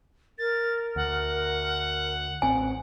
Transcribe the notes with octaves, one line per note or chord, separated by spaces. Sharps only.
A#4 A6
D2 F#5
A1 C4 G#5